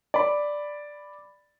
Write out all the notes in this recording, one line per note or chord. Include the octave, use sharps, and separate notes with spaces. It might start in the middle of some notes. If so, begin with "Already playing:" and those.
D5 B5